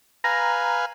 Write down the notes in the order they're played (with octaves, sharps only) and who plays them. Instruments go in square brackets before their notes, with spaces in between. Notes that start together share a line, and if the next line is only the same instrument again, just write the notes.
[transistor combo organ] B4 F5 G#5 [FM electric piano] A#5